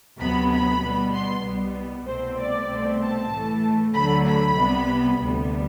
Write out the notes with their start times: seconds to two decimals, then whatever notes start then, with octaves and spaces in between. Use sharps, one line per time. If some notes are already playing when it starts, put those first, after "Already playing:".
0.20 D2 C3 F#3 B3 B5
0.51 B5
0.82 B2 G3 B3
1.14 C6
1.44 C2 B2 G3 B3
2.07 C2 B2 A3 C4 C5
2.39 D5
2.70 C2 B2 A3 C4
3.01 A5
3.32 A2 E3 A3
3.95 D2 D3 F#3 A3 B5
4.26 B5
4.57 C2 C3 G3 B3
5.19 D2 C3 G3 B3